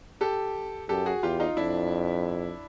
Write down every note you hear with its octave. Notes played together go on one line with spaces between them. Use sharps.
G4 A4
F#2 G4 A4
F#4 G#4
E2 F4 G4
D#4 F4
F2 D4 E4